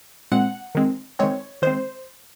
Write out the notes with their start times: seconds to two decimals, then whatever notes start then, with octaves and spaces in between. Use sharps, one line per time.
0.32 A#2 G#3 C4 F#5
0.75 D#3 G#3 C4
1.19 D#3 G#3 C4 C#5
1.62 D#3 G#3 C4 C5